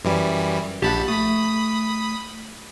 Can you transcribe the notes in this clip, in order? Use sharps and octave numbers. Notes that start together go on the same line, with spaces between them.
F#2 E3 G3
A#1 G4 F#5 A5 B5
A3 B5 D#6